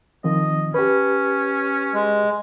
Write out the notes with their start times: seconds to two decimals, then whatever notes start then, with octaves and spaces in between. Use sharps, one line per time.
0.24 D#3 F3 C4 D#5
0.74 C#4 G4 B4
1.94 G#3